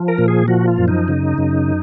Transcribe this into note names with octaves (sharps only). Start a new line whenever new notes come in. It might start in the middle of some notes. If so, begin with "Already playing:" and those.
Already playing: F3
A#4
A#2
G#4
F3 F#4
F4
F#2
D#4
C#3
F#2